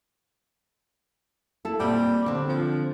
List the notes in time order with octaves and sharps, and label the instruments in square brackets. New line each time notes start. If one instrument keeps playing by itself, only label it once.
[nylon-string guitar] E4 A4
[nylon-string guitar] A#2 C4 [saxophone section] G3 G4
[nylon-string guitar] D3 C4
[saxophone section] F3